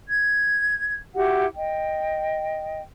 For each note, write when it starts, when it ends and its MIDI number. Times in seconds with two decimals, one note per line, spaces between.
0.07 0.97 92
1.15 1.44 64
1.15 1.44 66
1.15 1.44 67
1.15 1.44 78
1.54 2.80 75
1.54 2.80 79